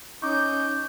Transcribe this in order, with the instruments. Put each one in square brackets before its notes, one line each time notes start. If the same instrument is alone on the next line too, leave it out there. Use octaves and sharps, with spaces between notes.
[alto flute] C#4 [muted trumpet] D#4 [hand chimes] C#6 D6 [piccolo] G6